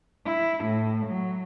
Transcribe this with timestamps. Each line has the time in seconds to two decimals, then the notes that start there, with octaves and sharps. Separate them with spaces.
0.25 E4
0.64 A2
1.05 F#3